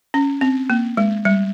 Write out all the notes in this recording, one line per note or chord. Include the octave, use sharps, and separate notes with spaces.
C#4
C4
A#3
G#3
G3